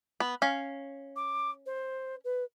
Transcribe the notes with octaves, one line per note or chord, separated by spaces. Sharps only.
B3
C#4 F5
D6
C5
B4